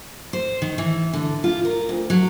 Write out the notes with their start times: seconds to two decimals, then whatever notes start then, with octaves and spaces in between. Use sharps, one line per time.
0.33 C5
0.62 D#3
0.78 E3
1.13 D3
1.44 F4
1.65 A#4
1.89 D2
2.10 F#3